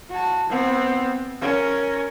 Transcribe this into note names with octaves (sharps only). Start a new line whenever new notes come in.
F#4 A5
B3 C4
C#4 A#4